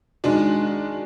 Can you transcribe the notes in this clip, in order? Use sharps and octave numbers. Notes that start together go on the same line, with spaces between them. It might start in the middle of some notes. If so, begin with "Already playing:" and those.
D#3 G#3 D4 F#4